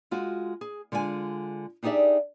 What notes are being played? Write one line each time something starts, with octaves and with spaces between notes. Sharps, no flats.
G#3 F4 F#4
G#4
D3 G#3 F4 D#5 G#5
D4 D#4 G4 G#4 D5 E5